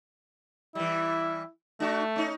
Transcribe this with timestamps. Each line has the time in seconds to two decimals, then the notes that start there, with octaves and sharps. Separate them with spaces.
0.75 E3 G3 E4
1.80 A3 D4 F#4
2.16 C#4 D#4